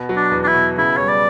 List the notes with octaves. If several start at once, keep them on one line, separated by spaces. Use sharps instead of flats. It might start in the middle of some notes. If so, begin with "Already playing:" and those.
Already playing: B2
F#3
D4
E2
D4
E4
B2
C#3 E4
G3 C#5
D5